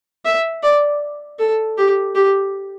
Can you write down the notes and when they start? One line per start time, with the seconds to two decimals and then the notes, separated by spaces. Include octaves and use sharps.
0.25 E5
0.63 D5
1.39 A4
1.78 G4
2.15 G4